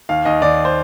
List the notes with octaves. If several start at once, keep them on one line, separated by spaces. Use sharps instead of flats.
D#2 F5
D#2 D#5
D#2 D5
C5